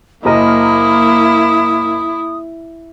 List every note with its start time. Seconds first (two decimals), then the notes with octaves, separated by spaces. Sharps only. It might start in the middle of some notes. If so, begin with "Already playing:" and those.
0.25 F#1 A#3 E4 A#4 D#5 D#6